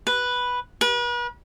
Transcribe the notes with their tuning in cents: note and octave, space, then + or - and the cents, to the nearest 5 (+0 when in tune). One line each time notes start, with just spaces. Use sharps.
B4 -5
B4 -40